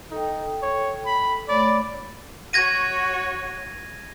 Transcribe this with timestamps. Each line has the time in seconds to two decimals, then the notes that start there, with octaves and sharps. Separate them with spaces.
0.11 D#4 A4 G5
0.63 C#5
1.06 B5
1.49 A3 C#5 D5 B5
2.53 F#4 C#5 G#6 A#6 D#7